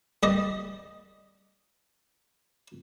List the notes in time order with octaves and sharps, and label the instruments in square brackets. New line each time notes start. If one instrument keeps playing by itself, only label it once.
[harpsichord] G3 D5 D#5